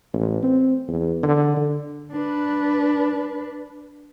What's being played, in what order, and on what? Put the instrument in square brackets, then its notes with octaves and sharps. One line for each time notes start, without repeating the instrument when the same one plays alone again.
[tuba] A1
C4
E2
D3
D3
[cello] D4 B4